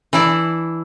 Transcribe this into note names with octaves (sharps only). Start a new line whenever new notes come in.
E3 D4 E4 D5